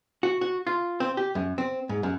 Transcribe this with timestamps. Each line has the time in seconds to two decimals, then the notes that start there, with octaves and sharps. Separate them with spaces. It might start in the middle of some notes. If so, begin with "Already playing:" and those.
0.23 F#4
0.41 F#4
0.67 F4
1.00 C4
1.17 G4
1.35 F#2
1.58 C4
1.89 G#2
2.03 F#2